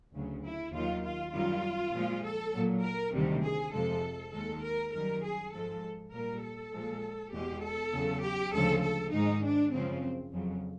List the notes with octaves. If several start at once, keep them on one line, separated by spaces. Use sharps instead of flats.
D2 C#3 F#3
E4
D#2 D#3 F#3 F4
F4
F#2 D#3 G3 F4
A#2 F3 G#3
A4
A#2 F#3
A#4
D2 C3 D#3 G3
G#4
F2 C3 F3 G#3 A4
D#2 D#3 G#3 A4
A#4
F#2 D#3 G3 A#4
G#4
G#2 F3 G#3 A4
A#2 G3 A#4
A4
A#2 F3 G#3
E2 B2 G#3 G4
A4
E2 C#3 F#3
G4
D2 C#3 F3 G#3 A4
A4
G#2 D#3 G#3 D#4
D4
F#2 C#3 F3 G#3 C4
F2 C#3 F#3